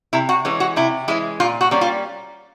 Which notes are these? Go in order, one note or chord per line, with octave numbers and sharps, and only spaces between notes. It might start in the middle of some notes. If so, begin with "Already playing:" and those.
C3 E4
F#4
E3 G#3 C#4
F#4
C3 E4
E3 G#3 C#4 E4
A#2 F4
F#4
G3 A#3 C#4
F4